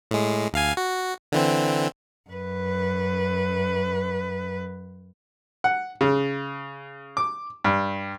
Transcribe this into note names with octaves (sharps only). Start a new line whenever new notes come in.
A2 G#3
D2 F5 G#5
F#4
D3 E3 C4
F#2 B4
F#5
C#3
D6
G2